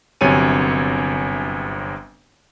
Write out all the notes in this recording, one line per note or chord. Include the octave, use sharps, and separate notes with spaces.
G1 F#2 C3 C#5 G#5 D#7